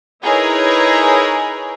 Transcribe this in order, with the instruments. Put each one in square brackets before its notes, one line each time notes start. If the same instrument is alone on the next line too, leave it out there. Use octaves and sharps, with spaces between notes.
[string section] D#4 E4 G#4 A#4 B4 C#5